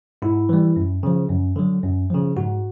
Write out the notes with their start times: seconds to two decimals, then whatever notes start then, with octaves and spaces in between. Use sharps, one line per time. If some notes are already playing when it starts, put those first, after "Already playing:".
0.22 G#2 E4
0.49 E3 G3
0.76 F#2
1.03 C#3 F3
1.30 F#2
1.56 D3 F#3
1.83 F#2
2.10 C#3 F3
2.37 G#2 F#4